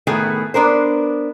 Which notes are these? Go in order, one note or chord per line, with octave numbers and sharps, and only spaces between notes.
A2 D#3 A3 B3 E4 G#4
B3 D4 A#4 C5